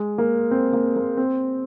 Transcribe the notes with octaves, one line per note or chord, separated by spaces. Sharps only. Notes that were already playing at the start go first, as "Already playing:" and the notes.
Already playing: G#3
A#3
C4
A#3
A#3
C4